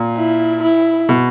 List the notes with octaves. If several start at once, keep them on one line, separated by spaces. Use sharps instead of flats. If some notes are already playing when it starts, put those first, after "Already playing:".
Already playing: A#2
E4
E4
B2